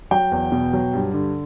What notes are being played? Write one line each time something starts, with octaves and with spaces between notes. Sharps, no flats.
F#3 G5
E2
B2
F#3
G2
D3